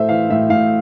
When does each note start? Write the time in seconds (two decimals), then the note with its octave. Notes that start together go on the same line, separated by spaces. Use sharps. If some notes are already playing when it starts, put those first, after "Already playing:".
Already playing: A2 A3 C5 E5
0.09 E3 F5
0.30 A2 E5
0.50 A2 F5